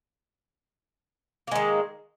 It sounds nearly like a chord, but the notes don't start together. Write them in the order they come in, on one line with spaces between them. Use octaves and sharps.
A#3 G#3 D#3